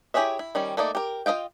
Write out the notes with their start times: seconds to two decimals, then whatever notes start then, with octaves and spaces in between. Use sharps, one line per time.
0.14 E4 G4 G#4 C#5 E5
0.39 E4
0.55 D#3 G3 C#4
0.77 A3 A#3 D#4 D5
0.95 G4 A#4
1.26 F4 B4 D#5 F5 G5